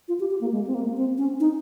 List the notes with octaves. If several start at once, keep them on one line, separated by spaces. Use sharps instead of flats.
F4
G4
G4
A#3
G#3
C4
A#3
C4
C#4
D#4